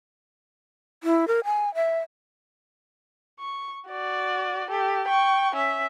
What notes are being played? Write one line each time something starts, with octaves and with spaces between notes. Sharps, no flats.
E4
A#4
G#5
E5
C#6
F#4 D5
G4 A4
G5 C#6
C#4 E5